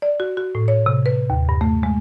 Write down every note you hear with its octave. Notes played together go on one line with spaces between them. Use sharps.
D5
F#4
F#4
A2
C#5
C3
B4
D#2
G2
A3
G#3